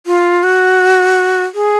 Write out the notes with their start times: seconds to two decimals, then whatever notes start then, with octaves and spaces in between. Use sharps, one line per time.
0.07 F4
0.43 F#4
1.55 G#4